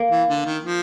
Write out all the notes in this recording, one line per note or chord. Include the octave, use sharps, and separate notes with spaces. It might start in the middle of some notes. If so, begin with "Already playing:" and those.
Already playing: A#3
E3
D3
D#3
F3